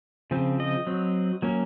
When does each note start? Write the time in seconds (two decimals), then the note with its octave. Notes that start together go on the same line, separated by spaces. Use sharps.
0.31 C#3 F3 C4
0.60 D#5
0.87 F#3 C4
1.42 F#3 A#3 C#4